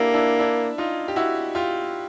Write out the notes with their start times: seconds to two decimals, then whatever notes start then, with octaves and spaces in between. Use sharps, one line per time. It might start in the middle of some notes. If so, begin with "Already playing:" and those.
Already playing: A#3 D4 E4 G4 A4
0.14 D4 E4
0.39 D4 E4
0.78 D#4 F4
1.08 G4
1.16 E4 F#4
1.55 F4 G4